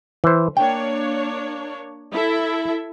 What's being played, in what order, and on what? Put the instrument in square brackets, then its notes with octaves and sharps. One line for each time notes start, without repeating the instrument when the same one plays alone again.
[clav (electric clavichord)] E3 C5
[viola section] A#3 D4 C#5 [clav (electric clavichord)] G5
[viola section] E4 A4 E5